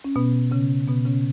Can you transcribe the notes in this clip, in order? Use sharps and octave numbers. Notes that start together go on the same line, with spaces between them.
C#4
B2 B3
C#3 C#4
B2 B3
C#3 C#4